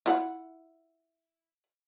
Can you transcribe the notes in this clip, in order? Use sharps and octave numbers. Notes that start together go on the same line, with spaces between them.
E4 F#5